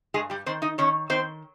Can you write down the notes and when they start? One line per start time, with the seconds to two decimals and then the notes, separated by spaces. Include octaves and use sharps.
0.14 G2 G#3 G#4
0.30 G3 G4
0.46 D#3 C4 C5
0.62 D#4 D#5
0.78 D#3 C#4 C#5
1.10 D#3 C4 C5